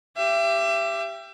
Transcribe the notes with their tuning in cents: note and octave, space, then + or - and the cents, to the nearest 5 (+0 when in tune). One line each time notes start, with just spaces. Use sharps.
G4 +0 E5 +35